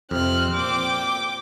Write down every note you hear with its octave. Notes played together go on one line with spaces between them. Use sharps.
F2 C3 C4 F6 F#6
A#2 G5 D6